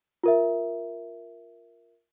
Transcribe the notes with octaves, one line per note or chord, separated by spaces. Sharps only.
F4 A#4 E5